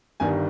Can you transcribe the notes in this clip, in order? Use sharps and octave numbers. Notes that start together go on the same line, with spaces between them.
G1 G2 D#3 G3 G#5